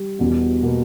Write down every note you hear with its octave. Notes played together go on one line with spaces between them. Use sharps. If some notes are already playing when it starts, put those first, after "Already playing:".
Already playing: G3
E1 E2 B2
B2 A#3